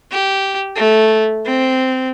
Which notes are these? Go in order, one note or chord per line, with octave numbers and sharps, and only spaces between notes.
G4
A3
C4